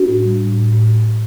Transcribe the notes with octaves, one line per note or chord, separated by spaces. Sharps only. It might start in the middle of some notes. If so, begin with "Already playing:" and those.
Already playing: D4 F#4
A2
G3
A2
A2
A2